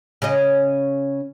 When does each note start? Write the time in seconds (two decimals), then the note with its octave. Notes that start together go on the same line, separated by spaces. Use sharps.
0.22 C#3 C#4 D#5